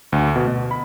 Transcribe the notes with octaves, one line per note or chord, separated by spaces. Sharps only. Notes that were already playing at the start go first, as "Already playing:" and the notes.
D2
B2
B2
B5